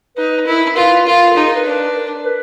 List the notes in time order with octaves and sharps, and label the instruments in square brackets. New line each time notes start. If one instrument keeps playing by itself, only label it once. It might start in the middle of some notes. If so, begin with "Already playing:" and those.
[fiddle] D#4 [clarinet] B4
[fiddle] E4 [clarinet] A#4
[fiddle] F4 [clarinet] B4
[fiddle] F4 [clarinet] A#4
[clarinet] A4
[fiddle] D#4 [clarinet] G#4
[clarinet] A#4
B4
[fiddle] D4
[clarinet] A#4
B4